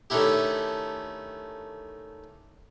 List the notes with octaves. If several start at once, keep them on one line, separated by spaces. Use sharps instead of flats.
D#3 A3 C#4 D4 E4 G4